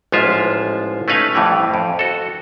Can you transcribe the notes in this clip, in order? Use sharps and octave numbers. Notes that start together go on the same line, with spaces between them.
A1 G#2 F3 G#3 F4 E5
A3 C#4 D#4 B4 F5 G#5
F2 A2 E3 G3
F2
F#4 A4